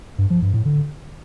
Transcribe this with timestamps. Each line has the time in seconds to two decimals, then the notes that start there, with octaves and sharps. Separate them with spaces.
0.18 G2
0.30 F3
0.42 G2
0.54 A2
0.65 D3